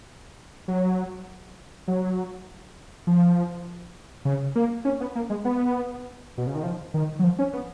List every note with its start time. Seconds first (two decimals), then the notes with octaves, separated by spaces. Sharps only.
0.68 F#3
1.88 F#3
3.07 F3
4.25 C#3
4.56 A#3
4.85 C#4
5.00 B3
5.15 A#3
5.30 G#3
5.45 B3
6.38 B2
6.47 C#3
6.55 D#3
6.63 F3
6.94 D#3
7.19 F#3
7.24 F3
7.39 C#4
7.53 B3